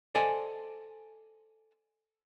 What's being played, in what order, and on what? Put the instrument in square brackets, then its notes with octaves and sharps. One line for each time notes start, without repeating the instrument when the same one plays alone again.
[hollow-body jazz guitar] A4 C5 D5 D#5 F#5 G#5